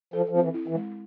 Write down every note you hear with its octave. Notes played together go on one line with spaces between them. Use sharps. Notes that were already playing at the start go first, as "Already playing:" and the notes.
F3 A4
F3
C4
E3
E4
E3
G#3